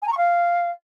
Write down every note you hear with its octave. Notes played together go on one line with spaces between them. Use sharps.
G#5
A#5
C#6
F5